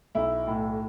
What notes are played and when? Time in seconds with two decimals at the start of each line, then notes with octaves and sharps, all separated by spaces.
0.15 B1 E4
0.47 A2